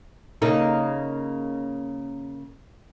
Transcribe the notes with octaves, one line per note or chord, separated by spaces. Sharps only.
C#3 A#3 D#4